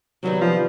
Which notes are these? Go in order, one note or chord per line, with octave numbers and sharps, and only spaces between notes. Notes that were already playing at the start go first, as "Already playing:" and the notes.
C3 D#3 F#3 G3 B3
F3